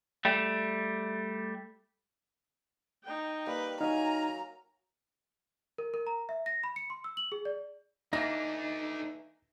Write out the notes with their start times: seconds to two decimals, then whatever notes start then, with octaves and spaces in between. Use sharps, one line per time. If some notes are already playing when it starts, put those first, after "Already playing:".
0.25 G3 A3
3.03 D#4 G5
3.46 G3 A#3 B4 F5
3.81 F#3 D#4 F5 G#5 A#5
5.78 A#4
5.94 A#4
6.07 A#5
6.29 E5
6.46 A#6
6.64 B5
6.76 C#7
6.90 C6
7.04 E6
7.17 F#7
7.32 G#4
7.45 D5
8.13 E3 A3 A#3 D4 D#4 A#6